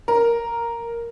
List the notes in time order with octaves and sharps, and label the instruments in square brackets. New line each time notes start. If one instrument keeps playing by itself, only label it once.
[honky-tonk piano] A#4